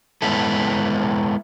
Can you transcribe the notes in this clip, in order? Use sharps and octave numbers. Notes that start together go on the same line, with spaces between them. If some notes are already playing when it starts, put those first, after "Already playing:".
G#3 B3 E4 A4